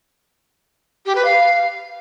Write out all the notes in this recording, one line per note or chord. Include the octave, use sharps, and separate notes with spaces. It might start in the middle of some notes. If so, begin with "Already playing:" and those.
G4
B4
F5